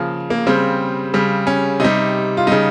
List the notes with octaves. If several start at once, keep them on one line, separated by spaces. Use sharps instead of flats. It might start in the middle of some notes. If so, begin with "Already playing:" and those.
Already playing: C#3 F3 A#3
A#3
C#3 G3 C4
C#3 G3
C#4
C3 G3 D#4
F4
C#3 G3 D#4